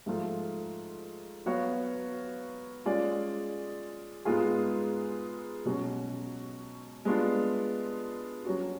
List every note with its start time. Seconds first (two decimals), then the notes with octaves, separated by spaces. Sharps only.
0.06 G#2 F3 A3 F4
1.46 F#3 B3 F#4 C#5 F5
2.86 G#3 C#4 F4 G#4 D5
4.25 G#2 G#3 B3 F4 G#4
5.65 B2 F#3 C#4 F#4
7.05 G#3 B3 D4 F4
8.45 F#3 C#4 F#4